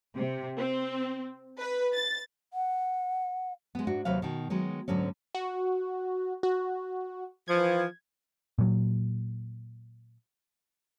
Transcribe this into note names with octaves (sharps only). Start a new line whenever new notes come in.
C3
C4
B4
A6
F#5
G#3 B3
G#2 D4 F#4
D#2 C3 F#3 B4 F5
B2 D#3
D#3 F#3 G#3 B3
D2 G#2 D3 F#3 C#4
F#4
F#4
E3 F3 G#6
A#2 F#3